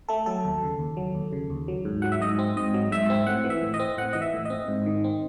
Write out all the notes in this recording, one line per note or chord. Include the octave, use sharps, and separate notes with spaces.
A3 A4
F#3 A4
D#2
C#3
D#2
F#3
D#2
C#3
D#2
F#3
G#2
F#3 F#5
E5
G#2 D#5
C4
G#2 D#5
F#3
G#2 E5
C4
A2 F#5
E3
E5
A2
D#5
C4
A2 F#5
E3 D#5
E5
A2
C4 D#5
G#2
D#3
C4